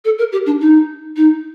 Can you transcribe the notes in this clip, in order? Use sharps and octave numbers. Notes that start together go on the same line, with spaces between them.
A4
A#4
G4
D4
D#4
D#4